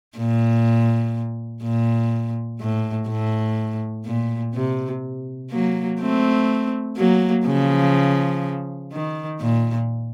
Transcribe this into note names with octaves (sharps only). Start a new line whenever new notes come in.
A#2
A#2
A2
A2
A#2
C3
F#3 A#3
A3 C4
F#3 A#3
C#3 F3
D#3
A#2